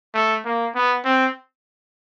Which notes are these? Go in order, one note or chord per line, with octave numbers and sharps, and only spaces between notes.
A3
A#3
B3
C4